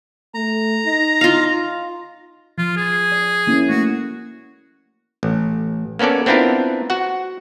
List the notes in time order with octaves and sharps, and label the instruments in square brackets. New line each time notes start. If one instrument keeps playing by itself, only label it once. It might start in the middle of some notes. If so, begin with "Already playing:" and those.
[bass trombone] A3 [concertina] A#5
[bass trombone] D#4 [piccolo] A#6
[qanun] F4 F5
[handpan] F3 [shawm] F4
[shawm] G#4
[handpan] D5
A#3 C#4 E4
[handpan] A3 [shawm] F#4
[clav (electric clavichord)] A1
A#3 B3 C#4 A4 D5
B3 C4 D4 E4 F4 A#4
F#4 F#5